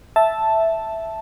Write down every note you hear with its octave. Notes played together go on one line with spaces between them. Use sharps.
E5 A5